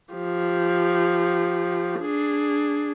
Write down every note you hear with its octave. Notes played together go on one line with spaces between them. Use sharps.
F3 G4
D4 G#4